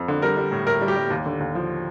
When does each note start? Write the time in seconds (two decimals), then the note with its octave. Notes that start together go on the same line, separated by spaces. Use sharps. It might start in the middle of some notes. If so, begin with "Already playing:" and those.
Already playing: F2
0.08 D3
0.22 G3 A#4
0.37 G3
0.52 A2
0.66 A2 A#4
0.81 G3
0.88 G4
0.96 G3
1.10 D#2
1.26 D3
1.40 D#2
1.55 F3